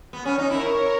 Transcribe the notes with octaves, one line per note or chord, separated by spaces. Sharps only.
B3
C#4
D#4
E4 A#4 C#5